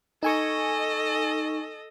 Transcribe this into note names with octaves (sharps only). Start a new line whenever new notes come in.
D#4 A4 D#5 G#5 C#6